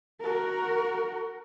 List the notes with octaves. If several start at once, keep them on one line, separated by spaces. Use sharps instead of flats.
F#4 A#4